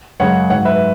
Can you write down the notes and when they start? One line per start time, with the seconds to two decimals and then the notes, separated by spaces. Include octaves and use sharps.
0.20 F#2 C#3 G#3 C#5 F#5
0.50 G#2 C#5 F#5
0.53 F#3
0.65 B4 E5